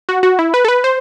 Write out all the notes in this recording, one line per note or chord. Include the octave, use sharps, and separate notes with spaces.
F#4
F#4
E4
B4
A4
B4
C5